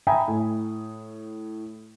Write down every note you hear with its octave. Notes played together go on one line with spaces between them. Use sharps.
E5 G5 G#5 A#5 B5 D#6
A2